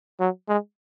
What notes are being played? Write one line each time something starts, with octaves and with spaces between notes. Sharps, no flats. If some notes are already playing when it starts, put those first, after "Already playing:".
F#3
G#3